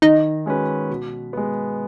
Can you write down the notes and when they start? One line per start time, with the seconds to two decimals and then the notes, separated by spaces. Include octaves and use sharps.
0.02 D#3 D#4 D#5
0.46 G#3 C#4 F#4 B4
0.90 B2
1.33 G#3 B3